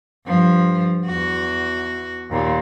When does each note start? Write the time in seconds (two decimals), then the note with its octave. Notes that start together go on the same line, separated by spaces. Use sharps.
0.26 G2 F3
1.06 E2 F#4
2.30 D#2 A#2